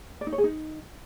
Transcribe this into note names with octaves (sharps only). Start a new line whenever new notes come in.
D5
D#4
C#5
G#4
D#4